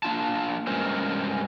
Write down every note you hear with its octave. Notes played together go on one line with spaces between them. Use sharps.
A#3 D4 F4 A5
G2 G#3 C#4 A#4 C5